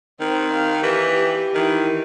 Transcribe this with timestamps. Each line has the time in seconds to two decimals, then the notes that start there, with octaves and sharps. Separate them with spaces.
0.20 D#3 C4
0.54 F5
0.83 E3 G4
1.54 D#3 E3